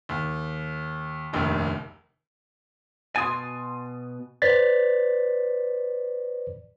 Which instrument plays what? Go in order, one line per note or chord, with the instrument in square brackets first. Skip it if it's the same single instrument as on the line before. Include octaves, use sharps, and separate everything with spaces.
[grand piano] D#2
F1 A#1 D#2 D#3
[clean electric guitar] B2 G#5 [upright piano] C6 D#6 A6
[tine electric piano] B4 C5 D5 A6 B6